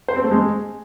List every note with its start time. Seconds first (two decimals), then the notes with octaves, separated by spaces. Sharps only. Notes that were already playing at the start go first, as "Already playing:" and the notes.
0.08 C5
0.16 C4
0.24 A3
0.31 G#3